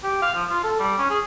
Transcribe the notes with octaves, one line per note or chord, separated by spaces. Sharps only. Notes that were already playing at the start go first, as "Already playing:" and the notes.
G4
F5
F3
F4
A4
G3
C#4
G#4